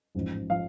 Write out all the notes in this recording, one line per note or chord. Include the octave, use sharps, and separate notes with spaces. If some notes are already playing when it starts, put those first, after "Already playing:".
A1 G#2 F3
F3 F5